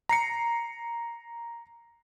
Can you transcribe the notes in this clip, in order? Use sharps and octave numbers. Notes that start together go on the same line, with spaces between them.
A#5 C7 C#7